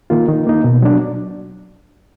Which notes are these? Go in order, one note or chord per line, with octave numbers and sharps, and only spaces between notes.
D#3 A#3 F4
D#3
A#3 D#4
B2
F#3 D4